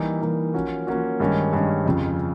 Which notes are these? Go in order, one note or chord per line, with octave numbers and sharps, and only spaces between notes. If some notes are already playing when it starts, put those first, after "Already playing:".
Already playing: E3 G3 A#3 D#4
E3 G3 A#3 D#4
F3 A#3 C#4 F#4
F3 A#3 C#4 F#4
G2 D#3 G#3 C#4
G2 D#3 G#3 C#4
F2 C#3 F3